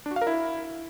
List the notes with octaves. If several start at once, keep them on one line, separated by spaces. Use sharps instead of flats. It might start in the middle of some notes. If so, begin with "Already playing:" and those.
D4
F#4
F5
A#4
E4